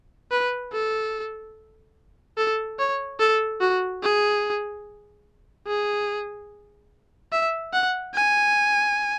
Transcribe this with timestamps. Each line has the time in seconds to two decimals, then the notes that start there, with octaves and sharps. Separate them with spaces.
0.31 B4
0.73 A4
2.37 A4
2.79 C#5
3.20 A4
3.61 F#4
4.03 G#4
5.67 G#4
7.32 E5
7.73 F#5
8.15 G#5